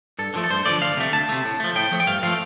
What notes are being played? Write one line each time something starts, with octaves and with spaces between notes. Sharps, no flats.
G2 A4
D3 F3 A3
A4
G2 C5
D3 F3 A3 D5
D2 F5
C3 A3
D2 A5
C3 A3
A2
F3 A3
A2 G5
F3 A3
G5
G2 F5
F3 A3 F5